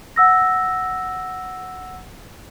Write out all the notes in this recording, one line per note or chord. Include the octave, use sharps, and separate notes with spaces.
F#5 E6 A#6